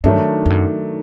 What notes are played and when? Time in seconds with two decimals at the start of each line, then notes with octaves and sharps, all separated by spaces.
0.04 G2 D#3 F#3 A3 D4
0.46 F2
0.50 F#2